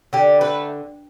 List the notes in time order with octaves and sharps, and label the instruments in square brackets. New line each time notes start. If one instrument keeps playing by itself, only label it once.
[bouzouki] D3 G4
A3 B4